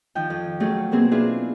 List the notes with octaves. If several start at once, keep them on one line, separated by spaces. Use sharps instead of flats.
D#3 F3 G5
F2
F#3 A3 C#4 F#4 G#4
B2 A#3 C4 G#4
D4 E4 F4 G#4 B4 C5